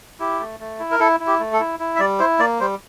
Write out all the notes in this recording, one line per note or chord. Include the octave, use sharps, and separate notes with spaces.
E4 G4
A3
A3
E4
A#4
E4 A4
E4
G4
A3
A4
E4
E4
E5
G3 D5
E4 C5
A#3 D5
G3 C5